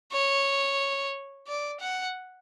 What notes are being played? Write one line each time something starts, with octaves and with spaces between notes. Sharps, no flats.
C#5
D5
F#5